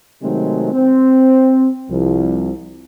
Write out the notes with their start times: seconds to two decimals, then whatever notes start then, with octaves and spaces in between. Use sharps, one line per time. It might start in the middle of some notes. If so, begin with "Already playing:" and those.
0.23 C3 D#3 F#3 G#3 A3 C4
0.73 C4
1.90 C2 F3